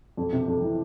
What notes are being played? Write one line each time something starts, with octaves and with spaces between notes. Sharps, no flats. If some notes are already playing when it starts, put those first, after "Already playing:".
F2
C3
F2
E3